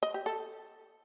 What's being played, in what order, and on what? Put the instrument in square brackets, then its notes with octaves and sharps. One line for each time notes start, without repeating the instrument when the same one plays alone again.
[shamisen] D#5
G4
A4